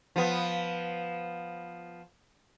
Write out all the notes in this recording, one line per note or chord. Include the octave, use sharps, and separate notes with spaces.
F3 B3